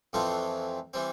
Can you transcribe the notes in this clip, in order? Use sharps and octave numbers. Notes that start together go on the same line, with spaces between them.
F2 E3 A3 C4 F4
E3 G3 C4